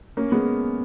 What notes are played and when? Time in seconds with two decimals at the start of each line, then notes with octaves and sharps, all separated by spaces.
0.17 A#3 C#4
0.32 G#3 B3